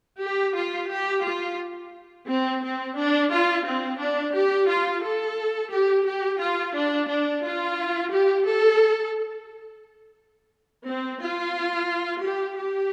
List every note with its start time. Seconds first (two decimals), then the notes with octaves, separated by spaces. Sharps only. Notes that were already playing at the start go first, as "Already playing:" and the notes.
0.22 G4
0.56 F4
0.90 G4
1.24 F4
2.28 C4
2.61 C4
2.96 D4
3.30 F4
3.64 C4
3.99 D4
4.34 G4
4.68 F4
5.02 A4
5.71 G4
6.05 G4
6.40 F4
6.74 D4
7.08 D4
7.42 F4
8.11 G4
8.46 A4
10.86 C4
11.20 F4
12.23 G4
12.57 G4